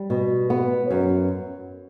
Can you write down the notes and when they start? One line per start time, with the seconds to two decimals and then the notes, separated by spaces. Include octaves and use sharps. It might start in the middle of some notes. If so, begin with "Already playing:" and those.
Already playing: G3
0.10 B2
0.50 B3
0.90 F#2